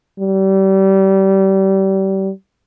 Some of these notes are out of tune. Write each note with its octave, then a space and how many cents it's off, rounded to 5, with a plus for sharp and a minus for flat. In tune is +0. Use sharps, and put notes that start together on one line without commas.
G3 -30